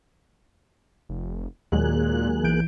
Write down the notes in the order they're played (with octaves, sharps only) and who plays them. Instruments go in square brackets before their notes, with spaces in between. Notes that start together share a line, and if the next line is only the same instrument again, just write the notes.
[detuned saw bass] F1
[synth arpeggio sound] D#2 F#3 G#3 [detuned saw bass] A#2 [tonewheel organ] A#3 G#4 F#6
[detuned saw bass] B1 [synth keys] E3 G6 D7